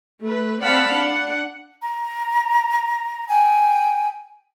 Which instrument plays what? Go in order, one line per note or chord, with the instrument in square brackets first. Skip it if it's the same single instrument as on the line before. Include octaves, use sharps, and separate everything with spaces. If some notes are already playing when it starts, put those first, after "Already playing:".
[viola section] A3 B4
C4 D5 F5 F#5 A5 B5
D4 F#5
[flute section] A#5
G5 G#5